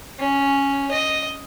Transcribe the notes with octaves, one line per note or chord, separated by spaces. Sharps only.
C#4
D#5